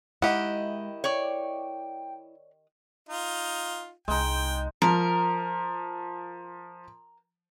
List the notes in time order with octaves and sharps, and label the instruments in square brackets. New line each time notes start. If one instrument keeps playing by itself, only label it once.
[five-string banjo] D#3 G4 F#5 [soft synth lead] G#3 [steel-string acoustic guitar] E4 D#5
[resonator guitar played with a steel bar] C#5 D5 [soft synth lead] G5
[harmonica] D#4 F4
[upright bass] C2 [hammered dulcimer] G#3 D#4 [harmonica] G5
[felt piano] F3 [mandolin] A#4